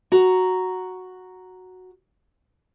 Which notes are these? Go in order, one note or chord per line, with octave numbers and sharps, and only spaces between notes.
F#4 A#5